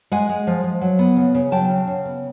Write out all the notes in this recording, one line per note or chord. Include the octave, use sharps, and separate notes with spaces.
G#3 F#5 G#5
G#3
F3
F3
F#3
B3
C#3
C#3
F#3 G5 A5
C#3
C#3
B3